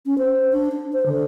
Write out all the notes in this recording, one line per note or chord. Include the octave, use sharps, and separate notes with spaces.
C#4
C5
D4
D4
C5
D3